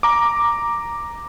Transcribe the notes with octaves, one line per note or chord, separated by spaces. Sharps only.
A#5 D6